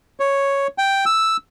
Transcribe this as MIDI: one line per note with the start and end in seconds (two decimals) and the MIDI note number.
0.20 0.67 73
0.78 1.05 79
1.06 1.37 88